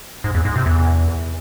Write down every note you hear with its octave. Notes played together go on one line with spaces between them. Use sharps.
G#2
E2
G#2
C3
E2